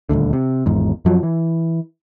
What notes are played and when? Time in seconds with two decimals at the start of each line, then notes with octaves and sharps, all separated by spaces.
0.09 D#1 G#1 D2 D3
0.33 C3
0.66 G#1 E2 G#2
1.05 F#2 F3 F#3
1.23 E3